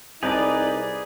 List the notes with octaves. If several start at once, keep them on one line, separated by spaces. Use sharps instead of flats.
C2 D#4 G4 G#4 B4 D5 D#5 A#5